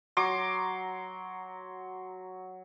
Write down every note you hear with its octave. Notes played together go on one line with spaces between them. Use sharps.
F#3 C6 D6